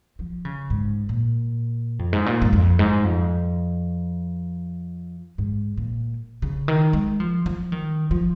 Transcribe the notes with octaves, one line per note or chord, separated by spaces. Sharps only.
F3
C#3
G#2
A#2
F2
G#2
A#2
G#2
F2
G#2
F2
G#2
A#2
C#3
D#3
G#3
F3
F3
D#3
F3